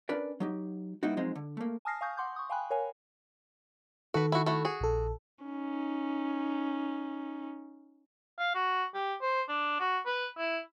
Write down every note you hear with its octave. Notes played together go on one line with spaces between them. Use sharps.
C#4 D4 A#4 B4 D5
F#3 D#4 G4
G3 A#3 B3 D#4 E4 F#4
F3 F#3 G#3 C4 D#4
D3
A3 A#3
G#5 A5 D#6 F6 A#6 C7
F5 G#5 C#6 D#6 G6
F#5 C6 D6 G6
C#6 D#6
F5 G5 G#5 B5 F#6
A#4 C#5 F5 G#5
D#3 F#4 A4 B4
E4 F#4
A3 E4 F#4
F#4 G#4
A#1 A4
C#4 D#4
F5
F#4
G4
C5
D4
F#4
B4
E4